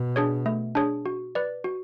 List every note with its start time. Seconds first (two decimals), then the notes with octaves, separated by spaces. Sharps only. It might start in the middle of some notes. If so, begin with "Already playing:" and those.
Already playing: B2
0.16 D4 G#4 C#5
0.46 A3
0.75 D4 G#4 C#5
1.06 F#4
1.35 B4 D5
1.64 F#4